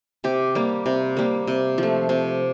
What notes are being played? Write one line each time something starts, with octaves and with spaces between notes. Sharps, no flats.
C3 G4
G3 A#3
C3
G3 A#3
C3
F3
A3
C3